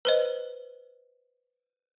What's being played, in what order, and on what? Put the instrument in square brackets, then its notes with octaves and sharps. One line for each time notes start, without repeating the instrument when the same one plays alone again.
[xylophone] B4 C5 D#5